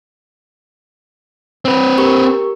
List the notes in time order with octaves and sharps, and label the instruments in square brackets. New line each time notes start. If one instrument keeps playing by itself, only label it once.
[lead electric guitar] C4 B4
[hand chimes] G4 A#4 C#6